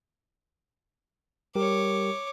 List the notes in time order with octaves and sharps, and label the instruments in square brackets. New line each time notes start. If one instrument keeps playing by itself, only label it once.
[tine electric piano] G3 G4 A#4 [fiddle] C#5 D6